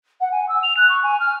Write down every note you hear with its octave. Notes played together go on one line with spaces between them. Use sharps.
F#5
G#5
E6
F7
F#6
C#6
G#5
F6